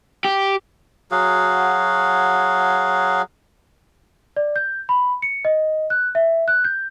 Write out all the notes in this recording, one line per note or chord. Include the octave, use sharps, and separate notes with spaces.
G4
F#3 F#4 G#4 F5
D5
G6
B5
C#7
D#5
F#6
E5
F#6
G6